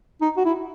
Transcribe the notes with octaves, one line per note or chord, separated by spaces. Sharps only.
D#4
F#4
E4